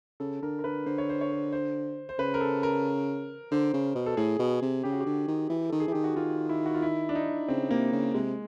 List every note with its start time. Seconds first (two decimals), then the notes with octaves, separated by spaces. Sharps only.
0.20 C#3 A4
0.42 D3 A#4
0.59 A#4
0.64 D3 B4
0.86 D3 C5
0.98 C#5
1.09 C5
1.21 C#5
1.32 C5
1.52 C5
2.09 C5
2.19 C#3 B4
2.34 A#4
2.41 A4
2.63 A#4
3.51 D3 C5
3.74 C#3
3.95 B2
4.06 A4
4.17 A2 G#4
4.39 B2
4.62 C3
4.83 C#3 G4
4.92 F#4
5.01 G4
5.06 D3
5.28 D#3
5.50 E3
5.69 D#3 A4
5.80 G#4
5.88 E3
5.92 D#3 G4
6.04 F#4
6.16 D#3 F4
6.49 E4
6.66 F#4
6.74 F4
6.82 E4
7.09 D4
7.15 D#4
7.48 C#3 C4
7.71 C3 A#3
7.92 C#3
8.14 C3 G#3